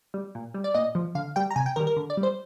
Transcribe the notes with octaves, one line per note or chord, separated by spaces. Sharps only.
G3
A#2
G3
D5
A#2 D#5
F3
D3 F5
G3 G5
A#5
C3 G#5
G5
D#3 G3 A#4
A#4
D3
D5
G3
C5